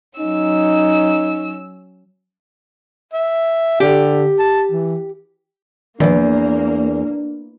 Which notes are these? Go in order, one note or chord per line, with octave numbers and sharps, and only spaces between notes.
F#3 C#4 D#4 E6
E5
D3 G4
A5
E3
E2 D#3 F3 A#3 D4